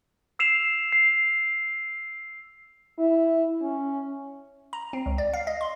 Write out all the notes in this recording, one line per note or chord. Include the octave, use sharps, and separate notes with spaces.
E6 C7 E7 F7
C7
E4
C#4
A#5
C4
C#2
D5
F5
D#5
C6